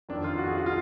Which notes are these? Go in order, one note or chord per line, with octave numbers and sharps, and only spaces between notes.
F2 D#3 D4
F4
F#4
G#4
F#4
F4